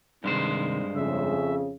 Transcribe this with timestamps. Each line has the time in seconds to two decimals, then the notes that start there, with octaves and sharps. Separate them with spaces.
0.24 G2 C3 D#3 G#3 C5
0.96 F2 C#3 E5